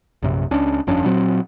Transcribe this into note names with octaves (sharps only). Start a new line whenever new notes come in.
A#1 F#2 C3
C#2 C#4 D4
G1 F2 C#4 D4
A#2 F#3 C4